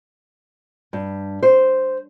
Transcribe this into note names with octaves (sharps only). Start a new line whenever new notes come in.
G2
C5